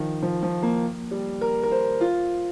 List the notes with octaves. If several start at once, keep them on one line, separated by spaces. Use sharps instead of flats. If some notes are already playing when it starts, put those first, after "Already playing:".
Already playing: D#3 F3
F3
F3
A#3
G3
A#4
A#4
C5
F4